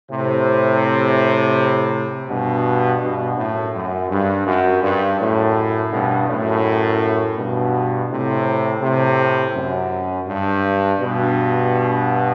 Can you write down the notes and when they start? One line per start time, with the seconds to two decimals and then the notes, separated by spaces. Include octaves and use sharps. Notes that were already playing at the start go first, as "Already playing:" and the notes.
0.10 A2 C3
2.28 G2 B2
3.01 G2 B2
3.37 F#2 A2
3.74 F#2
4.10 G2
4.46 F#2
4.82 G2
5.19 F#2 A2
5.92 G2 B2
6.28 F#2 A2
7.37 G2 B2
8.09 A2 C3
8.81 A2 C3
9.55 F#2
10.27 G2
11.00 G2 B2